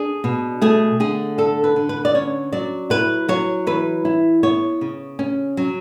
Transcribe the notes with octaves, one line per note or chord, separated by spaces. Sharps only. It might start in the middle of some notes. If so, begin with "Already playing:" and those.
Already playing: D4 G#4
B2
A3 G#4
D3 G#4
D4 A4
B4
D3
B4
D5
C#4 C#5
F#3 D5
E4 B4
F#3 C#5
E3 B4
E4
B3 C#5
C#3
C#4
F#3